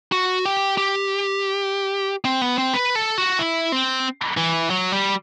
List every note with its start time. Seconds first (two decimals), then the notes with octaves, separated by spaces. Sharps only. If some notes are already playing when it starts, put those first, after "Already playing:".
0.12 F#4
0.45 G4
0.78 G4
2.25 C4
2.41 B3
2.58 C4
2.74 B4
2.95 A4
3.18 F#4
3.39 E4
3.72 C4
4.37 E3
4.70 F#3
4.92 G3